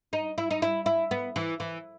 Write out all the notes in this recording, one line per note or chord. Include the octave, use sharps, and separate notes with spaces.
D#4
E4
D#4
E4
E4
B3
E3
E3